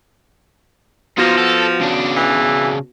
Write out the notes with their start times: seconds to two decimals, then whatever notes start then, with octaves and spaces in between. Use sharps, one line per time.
1.18 F3 B3 D#4 F4 F#4 A#6
1.38 A4
1.81 C#3 D4
2.16 E3